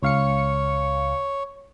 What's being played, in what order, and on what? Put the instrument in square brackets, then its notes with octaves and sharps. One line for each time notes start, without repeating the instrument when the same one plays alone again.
[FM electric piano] C#2 F5 C#7 [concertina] C#5